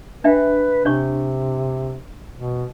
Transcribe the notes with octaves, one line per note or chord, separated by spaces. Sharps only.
D4 B4 E5 G5
C3 D4 C#5 C#6
B2